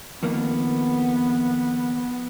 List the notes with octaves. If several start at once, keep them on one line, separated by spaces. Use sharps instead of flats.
F2 D#3 A#3 B3